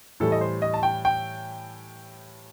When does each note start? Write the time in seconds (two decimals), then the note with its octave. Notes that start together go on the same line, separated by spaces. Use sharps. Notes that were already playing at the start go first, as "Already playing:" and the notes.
0.20 A2 E3 G3 A4
0.32 D#5
0.41 C5
0.62 D#5
0.74 A5
0.83 G5
1.05 G5